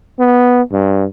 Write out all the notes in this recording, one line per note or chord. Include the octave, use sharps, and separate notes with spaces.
B3
G2